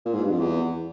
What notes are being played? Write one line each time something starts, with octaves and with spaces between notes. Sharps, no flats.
A#2
G#2
G2
F2
E2